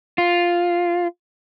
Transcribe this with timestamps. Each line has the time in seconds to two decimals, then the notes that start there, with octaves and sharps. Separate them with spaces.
0.18 F4